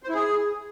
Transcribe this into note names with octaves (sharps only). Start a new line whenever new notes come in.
C5
E4
G#4